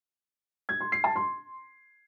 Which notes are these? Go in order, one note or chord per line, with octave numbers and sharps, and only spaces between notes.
G#6
C6
C7
A5
C6